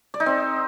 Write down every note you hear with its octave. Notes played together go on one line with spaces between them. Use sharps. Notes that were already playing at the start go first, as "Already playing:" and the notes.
D5
D#4
C4